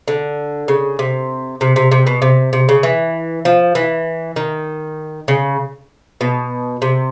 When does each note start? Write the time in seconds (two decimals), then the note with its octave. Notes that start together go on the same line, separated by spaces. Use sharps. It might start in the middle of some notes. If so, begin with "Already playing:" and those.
0.08 D3
0.68 C#3
0.99 C3
1.61 C3
1.76 C3
1.91 C3
2.07 B2
2.22 C3
2.53 C3
2.69 C#3
2.83 E3
3.45 F3
3.75 E3
4.36 D#3
5.28 C#3
6.21 B2
6.82 C3